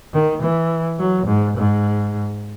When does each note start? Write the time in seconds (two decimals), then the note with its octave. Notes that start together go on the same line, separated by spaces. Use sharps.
0.13 D#3
0.42 E3
0.99 F#3
1.27 G#2
1.56 G#2